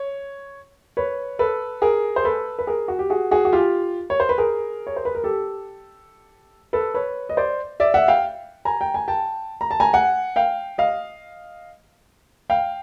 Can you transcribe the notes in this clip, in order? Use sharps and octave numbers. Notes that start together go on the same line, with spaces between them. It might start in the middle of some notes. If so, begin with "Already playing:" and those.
Already playing: C#5
B4 C#5
A4 B4
G#4 A#4
C5
A4 B4
B4
G#4 A#4
F#4
G4
F#4 G#4
F#4 G#4
F#4
F4 G4
C#5
C5
B4
G#4 A#4
C#5
C5
B4
A#4
G4 A4
A4 B4
B4 C#5
D#5
C5 D5
D5 E5
E5 F#5
F5 G5
G#5 A#5
G5
G#5
G5 A5
A#5
A5
G#5 A#5
F#5 G#5
F5 G5
D#5 F5
F5 G5